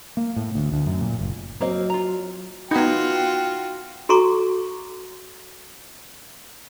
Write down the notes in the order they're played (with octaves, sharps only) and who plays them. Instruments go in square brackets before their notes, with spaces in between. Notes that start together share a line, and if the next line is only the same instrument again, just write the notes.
[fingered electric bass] A#3
A2
D2
D2
F#2
A#2
F#1
[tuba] F#3 [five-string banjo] A#3 C4 D#5
[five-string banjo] F4 A#5
[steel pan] B3 D#4 [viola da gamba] F4 F#4 [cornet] G5
[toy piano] F#4 A4 A#5 C#6 D6